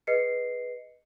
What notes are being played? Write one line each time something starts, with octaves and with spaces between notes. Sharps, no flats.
G#4 B4 D#5 C7 C#7